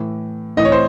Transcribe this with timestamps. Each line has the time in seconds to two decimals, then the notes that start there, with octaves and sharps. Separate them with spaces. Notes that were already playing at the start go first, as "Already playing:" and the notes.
Already playing: A2 E3
0.57 A2 E3 D#5
0.65 C#5
0.72 C5